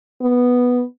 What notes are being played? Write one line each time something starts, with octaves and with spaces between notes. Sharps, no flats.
B3